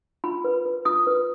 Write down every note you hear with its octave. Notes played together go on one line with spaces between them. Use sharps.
F4 B5
B4
B4
F4 D#6
B4